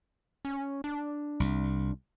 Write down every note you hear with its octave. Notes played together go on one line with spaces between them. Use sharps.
C#4
D4
C2